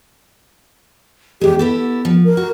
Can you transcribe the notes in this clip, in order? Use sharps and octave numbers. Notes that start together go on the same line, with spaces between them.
E2 G#3 G4
B3 E4 G4 A4
F3
A#4
F#4